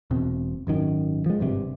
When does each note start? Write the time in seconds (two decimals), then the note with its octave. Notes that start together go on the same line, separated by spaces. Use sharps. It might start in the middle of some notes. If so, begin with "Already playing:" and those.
0.11 E1 B2 C4
0.67 G#1 F#2 D#3
1.26 F3 G#3
1.40 G#1 G2 C3